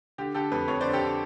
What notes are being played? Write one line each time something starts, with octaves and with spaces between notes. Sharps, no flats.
D3 G4
D3 G4 A4
F2 A4 B4
F2 B4 C#5
D3 C5 D5
G4 A4
D3